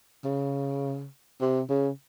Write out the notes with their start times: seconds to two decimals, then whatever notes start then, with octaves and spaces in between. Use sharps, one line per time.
0.24 C#3
1.41 C3
1.69 C#3